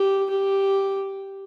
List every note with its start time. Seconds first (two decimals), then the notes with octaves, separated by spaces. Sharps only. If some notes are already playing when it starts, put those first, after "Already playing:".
Already playing: G4
0.30 G4